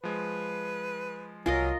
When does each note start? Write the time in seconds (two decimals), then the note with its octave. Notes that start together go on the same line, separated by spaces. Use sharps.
0.04 F3 G#3 B4
1.46 C2 F#3 F4 A#4 D#5 G#5